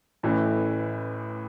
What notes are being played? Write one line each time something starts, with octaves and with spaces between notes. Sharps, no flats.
A1 A2 E3 C#4